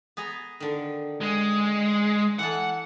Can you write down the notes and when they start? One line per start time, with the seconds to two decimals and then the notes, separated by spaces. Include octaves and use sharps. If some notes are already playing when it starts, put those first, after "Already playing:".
0.17 B3 G#4 A#5
0.60 D3 D#3
1.20 G#3
2.39 E3 A4 F#5